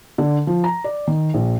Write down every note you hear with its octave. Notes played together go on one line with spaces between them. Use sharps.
D3
F3
A#5
D5
D#3
A#1